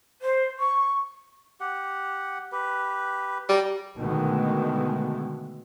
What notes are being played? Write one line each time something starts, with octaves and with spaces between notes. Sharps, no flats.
C5
C#6
G4 F#5
G4 B4
G3 A#5 D6
B2 D3 D#3 G#3 A3 B3